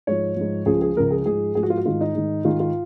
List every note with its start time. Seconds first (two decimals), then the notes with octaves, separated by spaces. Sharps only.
0.07 G#2 F3 C#5
0.37 G#2 F3
0.66 C#2 C#3 F3 G#4
0.81 G#4
0.96 C#2 C#3 F3 A#4
1.11 G#4
1.26 G#2 F3 G#4
1.55 G#2 F3 G#4
1.63 F#4
1.70 F4
1.77 F#4
1.86 G#2 D#3 F4
2.01 D#4
2.15 G#2 D#3
2.45 G#2 D#3 F4
2.60 F4